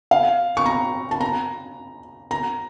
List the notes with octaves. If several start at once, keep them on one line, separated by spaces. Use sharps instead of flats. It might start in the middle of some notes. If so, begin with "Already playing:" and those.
F5
C#6
A#5
A5
A#5
A#5